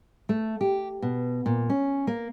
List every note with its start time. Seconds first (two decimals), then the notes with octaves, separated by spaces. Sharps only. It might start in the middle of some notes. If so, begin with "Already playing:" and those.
0.29 A3
0.61 G4
1.02 B2
1.46 A#2
1.70 C#4
2.07 A#3